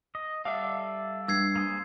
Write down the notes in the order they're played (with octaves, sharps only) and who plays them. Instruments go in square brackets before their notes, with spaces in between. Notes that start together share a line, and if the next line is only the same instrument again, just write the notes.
[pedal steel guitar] D#5
[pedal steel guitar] G3 A4 D5 [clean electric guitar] E5 F5
[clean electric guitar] G2 [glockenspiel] E6 G#6 C7
[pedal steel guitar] A#3 G#4 C5